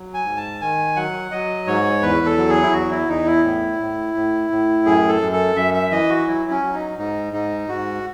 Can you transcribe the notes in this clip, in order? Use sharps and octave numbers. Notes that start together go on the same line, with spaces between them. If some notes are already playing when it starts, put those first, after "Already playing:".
Already playing: F#3
G#5
G#2
A5
D#3 G#5
F#3 F#5
F#3 D#5
G#2 C#5
E2 B4
A4
F#3
G#4
E4
E2 F#4
E4
E2 D#4
E4
A2
A2
A2
A2
F#2 G#4
A4
F#2
A4
F#2 E5
E5
E3 D#5
F#4
F#3 E4
C#4
F#3
D#4
G#2 D#4
G#2 D#4
G#2 F#4